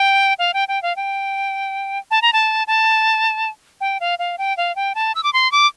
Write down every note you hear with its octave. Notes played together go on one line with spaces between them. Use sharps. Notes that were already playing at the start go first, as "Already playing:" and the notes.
Already playing: G5
F5
G5
G5
F5
G5
A5
A#5
A5
A5
G5
F5
F5
G5
F5
G5
A5
E6
D6
C6
D6